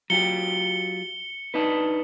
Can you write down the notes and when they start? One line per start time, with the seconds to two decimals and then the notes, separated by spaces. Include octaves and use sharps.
0.10 F#3 F4 G4 C#7 G7
1.54 D4 D#4 B4